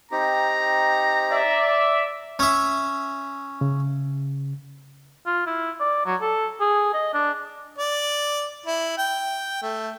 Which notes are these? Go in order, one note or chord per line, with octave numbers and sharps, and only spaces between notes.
C4 D#4 G4 A#5
D5 E5
C#4 E5
C#3
F4
E4
D5
F#3
A4
G#4
D#5
D4
D5
E4
G5
A3